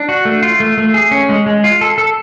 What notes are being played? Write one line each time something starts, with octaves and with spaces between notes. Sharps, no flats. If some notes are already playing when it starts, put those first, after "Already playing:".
Already playing: D4
F#4
A3
F4
A3
A3
G#4
C#4
G#3
G#3
F4
A4
A4